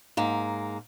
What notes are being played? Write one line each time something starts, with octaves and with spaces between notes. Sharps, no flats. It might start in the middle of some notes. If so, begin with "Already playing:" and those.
G#2 A#3